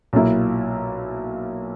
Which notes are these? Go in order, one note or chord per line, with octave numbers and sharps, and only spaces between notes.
B1 A#2 A#3 E4